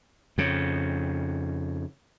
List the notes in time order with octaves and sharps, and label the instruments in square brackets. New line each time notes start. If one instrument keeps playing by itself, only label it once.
[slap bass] F2 C#3